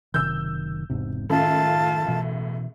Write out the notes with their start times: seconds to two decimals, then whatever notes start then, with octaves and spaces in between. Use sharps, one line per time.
0.14 F#1 C3 D#3 E6 G6
0.90 E1 G#2 C3
1.29 C#2 F#2 A2 D#3 F4 A5
2.08 B2 E3